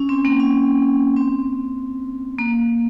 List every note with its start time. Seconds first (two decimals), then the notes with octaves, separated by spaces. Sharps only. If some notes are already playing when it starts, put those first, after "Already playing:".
Already playing: C#4
0.09 C4
0.25 A#3
0.40 C#4
1.16 C4
2.39 A#3